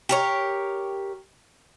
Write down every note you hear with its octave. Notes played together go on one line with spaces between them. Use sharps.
G4 A#4 C#5